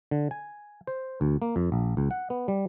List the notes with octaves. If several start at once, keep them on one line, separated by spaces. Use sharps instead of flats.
D3
G#5
C5
D2
A#3
F2
A#1
C#2
F#5
B3
G3